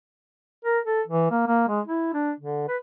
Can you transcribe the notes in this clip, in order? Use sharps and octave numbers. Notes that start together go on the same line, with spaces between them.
A#4
A4
E3
A#3
A#3
G#3
E4
D4
D3
B4